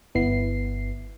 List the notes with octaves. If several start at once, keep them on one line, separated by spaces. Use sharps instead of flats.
G1 B3 E4 C7